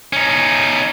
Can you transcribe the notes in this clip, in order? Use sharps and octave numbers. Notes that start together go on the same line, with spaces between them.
C#4 D#4